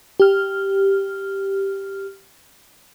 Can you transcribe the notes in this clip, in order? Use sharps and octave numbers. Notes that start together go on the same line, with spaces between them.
G4 F6